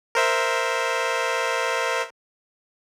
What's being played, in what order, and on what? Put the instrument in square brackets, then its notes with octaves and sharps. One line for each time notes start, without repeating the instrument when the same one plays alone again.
[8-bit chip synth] A#4 C5 E5